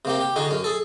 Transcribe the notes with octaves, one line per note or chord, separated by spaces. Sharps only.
C3 A#3 G4
G4
D3 D#4 F#4 G#4
F#2 C#4
G#4 A4